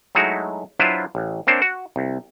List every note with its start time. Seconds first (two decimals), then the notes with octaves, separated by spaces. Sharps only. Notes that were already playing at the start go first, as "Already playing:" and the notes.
0.15 F#3 G#3 A3 D#4 E4 F#4
0.79 F#3 D4 E4 F4 B4 C5
1.15 A1
1.47 A#3 C4 D4 C5 C#5
1.62 F#4
1.96 C2